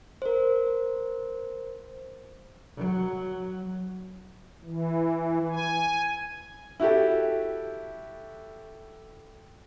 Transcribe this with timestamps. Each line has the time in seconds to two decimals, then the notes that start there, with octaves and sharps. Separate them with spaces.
0.22 A#4 C5
2.76 F#3
4.64 E3
5.50 G#5
6.80 E4 F#4 G4 A4